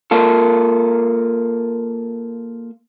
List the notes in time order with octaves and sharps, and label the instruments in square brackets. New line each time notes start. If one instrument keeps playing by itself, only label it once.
[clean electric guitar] A#3 F4 A4